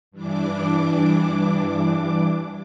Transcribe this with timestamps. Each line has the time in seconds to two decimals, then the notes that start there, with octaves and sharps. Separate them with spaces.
0.11 G2 E3 D4 D6